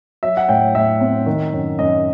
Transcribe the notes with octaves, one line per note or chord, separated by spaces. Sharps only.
F#3 E5
F#5
A2 G5
A2 E5
C4
D#3
F#2
F#2 D#5